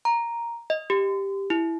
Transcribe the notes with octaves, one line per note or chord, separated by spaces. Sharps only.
A#5
D#5
G4
E4